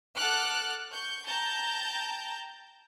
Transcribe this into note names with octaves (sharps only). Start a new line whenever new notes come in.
A4 F#5 D6 F6 F#6
C#6 G6
G5 A5 A#5 G6